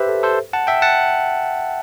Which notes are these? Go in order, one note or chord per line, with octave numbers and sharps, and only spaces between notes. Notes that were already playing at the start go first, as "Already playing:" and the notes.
Already playing: G4 B4 C5 E5
A4
A4 C5
F#5 A5
E5 G5
F#5 A5